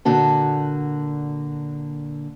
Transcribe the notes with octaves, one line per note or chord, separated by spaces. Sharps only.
A#2 D3 F#4 A5